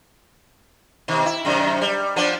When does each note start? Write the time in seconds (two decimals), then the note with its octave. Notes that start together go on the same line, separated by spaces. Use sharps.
1.08 B2 D#3
1.26 E4
1.45 F#2 C3 D#3
1.81 G3
2.16 F3 B3 D4